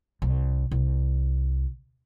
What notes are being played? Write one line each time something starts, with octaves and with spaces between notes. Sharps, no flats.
C2
C2